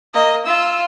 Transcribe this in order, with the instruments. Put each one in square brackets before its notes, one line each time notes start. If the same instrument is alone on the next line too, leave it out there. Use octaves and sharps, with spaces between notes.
[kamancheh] A#3 [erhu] D#5
[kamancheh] F4 [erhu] E6